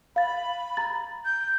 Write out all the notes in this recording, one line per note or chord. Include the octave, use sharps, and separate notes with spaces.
F5 B5 A6
A#5 A6
G6